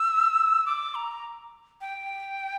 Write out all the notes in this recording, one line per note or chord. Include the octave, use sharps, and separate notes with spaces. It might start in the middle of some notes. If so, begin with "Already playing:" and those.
Already playing: E6
D6
A#5
G5